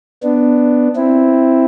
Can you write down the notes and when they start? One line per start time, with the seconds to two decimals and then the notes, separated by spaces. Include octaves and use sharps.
0.23 B3 D4
0.96 C4 E4